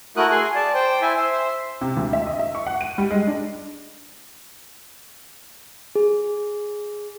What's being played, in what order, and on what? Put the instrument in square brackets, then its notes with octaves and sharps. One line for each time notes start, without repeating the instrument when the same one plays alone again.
[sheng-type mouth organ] A3 E4 F#4 A#4 D#6 F#6
G#4 G#5 C6
D5 A5
C5 G5
E4 E5 G#5
C5 E5 C6
[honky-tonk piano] C3
D2
E5
D#5
E5
C#6
F#5
D#7
G3
G#3
D4
[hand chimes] G#4